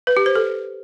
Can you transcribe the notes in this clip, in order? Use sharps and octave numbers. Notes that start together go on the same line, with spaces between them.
B4
G4
C5
A4